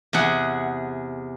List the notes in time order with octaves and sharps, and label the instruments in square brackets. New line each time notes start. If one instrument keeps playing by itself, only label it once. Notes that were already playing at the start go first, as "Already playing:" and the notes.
[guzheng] E2 C3 G#4 F#5